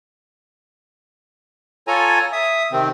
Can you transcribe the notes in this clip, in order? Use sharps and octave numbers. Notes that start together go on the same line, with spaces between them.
F4 A4 C#5 G#5 A#5
E5 D#6
C3 D#3 C4